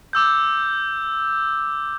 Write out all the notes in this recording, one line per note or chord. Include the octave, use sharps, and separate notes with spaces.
D6 E6 G6